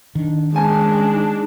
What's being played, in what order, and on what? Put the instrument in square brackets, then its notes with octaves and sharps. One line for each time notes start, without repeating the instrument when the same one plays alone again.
[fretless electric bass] D#3 [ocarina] D4
[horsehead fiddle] G#3 D4 [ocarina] C#4 [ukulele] C5 G#5 A5
[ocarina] D#4